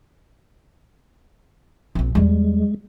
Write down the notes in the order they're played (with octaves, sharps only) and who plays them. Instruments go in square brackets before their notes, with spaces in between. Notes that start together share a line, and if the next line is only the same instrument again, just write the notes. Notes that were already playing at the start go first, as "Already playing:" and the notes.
[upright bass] A#1 C4
[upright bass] E2 G3 [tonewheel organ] G#3